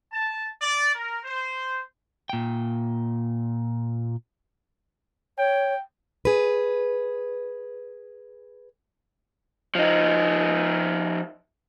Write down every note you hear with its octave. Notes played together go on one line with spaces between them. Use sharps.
A5
D5
A#4
C5
A#2 G5
C#5 G5
G#4 B4
F3 D#4